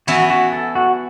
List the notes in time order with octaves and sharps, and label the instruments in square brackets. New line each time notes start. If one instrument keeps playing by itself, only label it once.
[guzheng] E3 B3 E4 [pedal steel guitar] F#4
[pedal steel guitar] F#4
A4
F#4